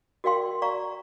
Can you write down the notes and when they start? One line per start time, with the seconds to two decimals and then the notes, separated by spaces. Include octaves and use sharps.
0.24 F#4 A#4 D5 F5 G5 C6
0.62 D5 F5 A#5 C#6